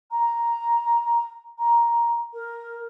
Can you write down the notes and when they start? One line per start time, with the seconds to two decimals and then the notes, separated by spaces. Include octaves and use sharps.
0.11 A#5
1.58 A#5
2.33 A#4